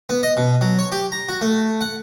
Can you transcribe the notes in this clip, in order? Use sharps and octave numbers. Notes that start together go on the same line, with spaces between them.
B3
D#5
B2
F#3
C#5
G4
A#5
F#4
A3
F#5